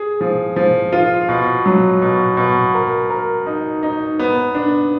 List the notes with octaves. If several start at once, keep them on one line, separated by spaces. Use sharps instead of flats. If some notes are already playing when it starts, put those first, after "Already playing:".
Already playing: G#4
F3
F3
F4
B2
F#3
B2
B2
A#4
A#4
D#4
D#4
B3
D4